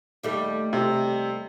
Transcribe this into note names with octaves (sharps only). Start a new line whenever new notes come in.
D#2 G3 A3
C3